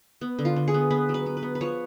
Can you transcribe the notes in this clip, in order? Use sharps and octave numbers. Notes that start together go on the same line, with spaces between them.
B3
D3
F4
D3
G#4
B3
B3 B4
F#3
B4
B3
B4
B3
B4
F3 C#5